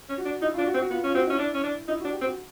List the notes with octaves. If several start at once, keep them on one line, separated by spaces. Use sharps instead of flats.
C#4
F#4
D4
D#4 E4
D4 F4
F#4
C4
F#4
B3 F4
C#4 F4
C4 F#4
C#4 E4
D4
C#4
D4
D#4 E4
D4 F#4
G4
C4
F#4